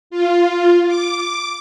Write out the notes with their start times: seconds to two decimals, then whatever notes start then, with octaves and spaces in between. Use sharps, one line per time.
0.10 F4
0.87 D6